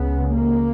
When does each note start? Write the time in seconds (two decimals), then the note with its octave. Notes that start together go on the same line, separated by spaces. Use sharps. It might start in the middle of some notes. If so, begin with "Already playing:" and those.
Already playing: C#2 C#3 B3
0.32 A#3